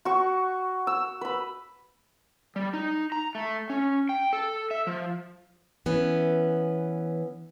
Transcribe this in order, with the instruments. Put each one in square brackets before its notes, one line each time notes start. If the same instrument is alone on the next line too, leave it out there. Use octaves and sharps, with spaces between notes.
[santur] F#4 C#6
E6
B4 B5
[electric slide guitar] G3
D#4
A#5
A3
C#4
G5
A4
E5
F3
[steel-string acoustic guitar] E3 B3 C#4